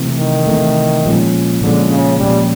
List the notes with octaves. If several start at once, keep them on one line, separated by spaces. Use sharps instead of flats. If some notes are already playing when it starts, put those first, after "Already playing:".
Already playing: C3 E3 A3
D#3
C3 E3 A3
A#2 F3 G#3 C#4
A#2 D3 F3 G#3 C#4
C#3
A#2 F3 G3 G#3 C#4